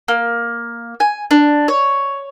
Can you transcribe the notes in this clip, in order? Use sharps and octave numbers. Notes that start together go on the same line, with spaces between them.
A#3
G#5
D4
C#5